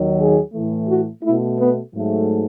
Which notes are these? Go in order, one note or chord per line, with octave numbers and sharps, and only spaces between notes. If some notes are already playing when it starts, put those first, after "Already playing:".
Already playing: D#2 D#3 F#3
G#4
A2 E3 A3
F#4
B2 A3 E4
B3
G#2 F#3 A3